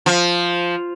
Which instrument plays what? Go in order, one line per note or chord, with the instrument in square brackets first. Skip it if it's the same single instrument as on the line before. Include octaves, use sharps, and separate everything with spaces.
[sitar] F3